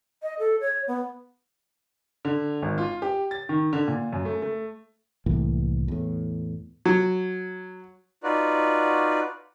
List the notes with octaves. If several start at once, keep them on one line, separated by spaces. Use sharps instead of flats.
D#5
A4
C#5
B3
D3
G#1
F4
G4
A6
D#3
D3
A#2
F#2
A3
A3
C2 A2 E3 A#3
E2 A2
F#3
D#4 F4 F#4 B4 D5